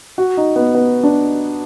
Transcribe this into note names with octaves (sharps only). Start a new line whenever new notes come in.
F#4
D#4
B3
B3
D4